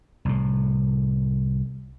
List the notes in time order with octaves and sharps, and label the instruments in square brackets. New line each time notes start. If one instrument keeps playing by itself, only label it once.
[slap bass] C2 A2